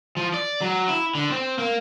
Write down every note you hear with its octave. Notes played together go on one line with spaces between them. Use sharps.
F3
D5
F#3
E4
D3
C4
A#3